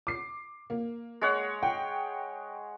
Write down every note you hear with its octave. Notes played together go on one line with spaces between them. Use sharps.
D6 C7
A#3
G#3 C#5 F#5
G5